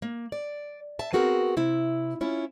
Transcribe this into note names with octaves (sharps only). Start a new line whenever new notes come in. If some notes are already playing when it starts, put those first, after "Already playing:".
A#3
D5
E5 A5
B3 C4 F#4 G#4 A#4
C3 E4
C#4 E4 F4